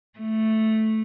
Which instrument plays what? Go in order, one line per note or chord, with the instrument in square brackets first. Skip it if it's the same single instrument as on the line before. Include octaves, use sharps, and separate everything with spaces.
[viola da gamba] A3